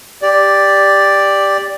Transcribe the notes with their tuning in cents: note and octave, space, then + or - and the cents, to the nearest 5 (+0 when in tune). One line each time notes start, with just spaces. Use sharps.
G4 +10 D5 +0